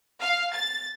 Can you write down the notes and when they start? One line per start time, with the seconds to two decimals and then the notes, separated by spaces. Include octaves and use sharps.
0.18 F5
0.52 A6